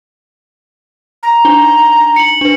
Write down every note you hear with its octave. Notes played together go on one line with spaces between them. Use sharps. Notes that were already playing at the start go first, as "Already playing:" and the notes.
A#5
D4 D#4 G7
C#7 F#7
D4 B4